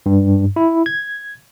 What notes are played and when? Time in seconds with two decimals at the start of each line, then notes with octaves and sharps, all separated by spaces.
0.06 G2
0.56 E4
0.86 G#6